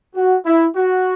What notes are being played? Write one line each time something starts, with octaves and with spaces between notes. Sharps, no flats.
F#4
E4
F#4